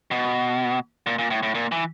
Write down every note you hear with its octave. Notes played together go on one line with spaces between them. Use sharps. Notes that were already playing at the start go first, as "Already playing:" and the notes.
B2
A#2
A#2
A2
A2
A#2
E3